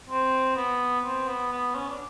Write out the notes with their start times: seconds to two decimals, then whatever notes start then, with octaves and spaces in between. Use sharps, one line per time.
0.10 C4
0.56 B3
1.04 C4
1.28 B3
1.52 B3
1.75 C#4
1.89 D4